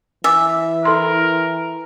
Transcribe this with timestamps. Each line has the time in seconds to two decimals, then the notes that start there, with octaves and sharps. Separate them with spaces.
0.24 E3 E5 G#5 D6
0.85 E4 A4 A#4 C6